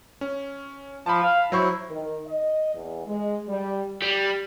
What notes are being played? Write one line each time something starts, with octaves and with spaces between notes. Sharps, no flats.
C#4
F3 A5 B5
F5
F#3 E4 C5 C#6
D#3
D#5
E2
G#3
G3
G3